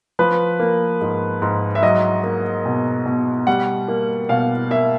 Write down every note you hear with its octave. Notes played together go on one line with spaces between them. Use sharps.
F3 B4
A#3
G#2
G#2
E5
F#3 D#5
A#3
B2
B2
G3 F#5
A#3
B2 F5
A#3 E5